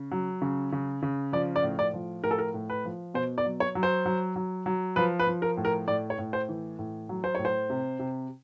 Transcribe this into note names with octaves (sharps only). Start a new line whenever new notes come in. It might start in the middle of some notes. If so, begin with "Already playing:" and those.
Already playing: C#3
F#3
C#3
C#3
C#3
F3 D5
D5
A2
D5
F3
A2 A#4
A4
A#4
A2
B4
F3
B2 C5
D5
F#3
C#5
F#3
C5
F#3
F#3
F#3
F3 B4
B4
F3
A#4
A2
A#4
A2 D5
C#5
A2
C5
E3
A2
F#3
C5
A2 C#5
C5
C3
C3